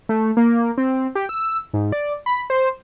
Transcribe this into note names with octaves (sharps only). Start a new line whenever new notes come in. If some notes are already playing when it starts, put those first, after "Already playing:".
A3
A#3
C4
G4
E6
G#2
D5
B5
C5